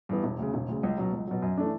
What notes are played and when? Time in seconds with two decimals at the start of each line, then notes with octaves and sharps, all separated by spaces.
0.09 G2 E3 B3
0.24 E1
0.39 D2 C#3
0.54 E1
0.68 D2 C#3
0.83 C#2
0.98 B2 F#3
1.13 C#2
1.27 B2 F#3
1.42 F#2
1.57 E3 A3 D4